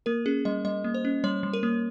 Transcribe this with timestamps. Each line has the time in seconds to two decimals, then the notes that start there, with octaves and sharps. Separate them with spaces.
0.06 A#3 A#4
0.26 C#4 G#4
0.45 G3 D#5
0.65 G3 D#5
0.84 A#3
0.94 C5
1.05 C#4
1.24 G3 C#5
1.43 G3
1.53 A#4
1.63 A#3